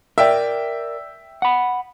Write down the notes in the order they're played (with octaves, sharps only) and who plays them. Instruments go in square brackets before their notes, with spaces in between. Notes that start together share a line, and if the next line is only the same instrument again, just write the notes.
[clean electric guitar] A#4 D5 [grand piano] E5 G5
[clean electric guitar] F#5 B5